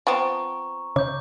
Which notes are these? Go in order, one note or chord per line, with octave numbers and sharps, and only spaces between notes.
F3 B3 C4 A#5 C#6
C#3 D6 G6